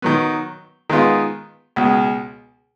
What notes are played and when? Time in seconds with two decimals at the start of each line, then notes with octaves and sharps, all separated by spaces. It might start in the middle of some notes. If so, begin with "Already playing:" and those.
0.02 D#3 F#3 B3
0.90 D#3 G#3 B3 F4
1.76 C#2 B2 G#3